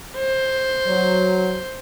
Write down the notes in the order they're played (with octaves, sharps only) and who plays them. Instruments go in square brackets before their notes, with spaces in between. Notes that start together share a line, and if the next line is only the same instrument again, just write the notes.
[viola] C5
[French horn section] F#3